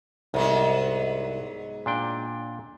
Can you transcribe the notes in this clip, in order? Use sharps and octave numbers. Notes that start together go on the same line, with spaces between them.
C2 G#2 F#3 B3
A#2 D4 G5